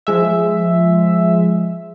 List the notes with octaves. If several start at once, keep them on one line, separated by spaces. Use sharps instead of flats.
F3 G#3 E5